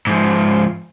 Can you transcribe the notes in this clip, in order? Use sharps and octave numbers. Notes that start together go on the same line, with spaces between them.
G#2 F3